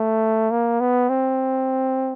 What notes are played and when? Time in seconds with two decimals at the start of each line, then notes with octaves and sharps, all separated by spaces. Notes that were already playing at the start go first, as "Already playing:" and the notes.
Already playing: A3
0.51 A#3
0.80 B3
1.09 C4